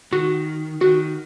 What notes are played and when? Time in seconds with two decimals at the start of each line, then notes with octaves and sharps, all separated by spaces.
0.13 D#3 F#4
0.81 D#3 F#4